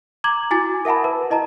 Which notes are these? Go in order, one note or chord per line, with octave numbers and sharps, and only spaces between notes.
A#5 D6 G#6 F#7
E4 F#4 G#5 D6 A6
A#4 E5 F#5 A5 B5
B4
E4 D#5 A5 A#5